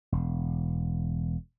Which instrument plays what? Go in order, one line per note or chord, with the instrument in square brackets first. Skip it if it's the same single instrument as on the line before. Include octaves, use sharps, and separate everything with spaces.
[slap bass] E1